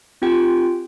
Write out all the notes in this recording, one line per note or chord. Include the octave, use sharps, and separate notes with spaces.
C4 F4 G4 G5 G#5